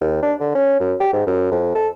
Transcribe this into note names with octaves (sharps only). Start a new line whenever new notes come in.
D#2
D4
D3
C#4
F#2
G4
G#2
F#2
F2
A4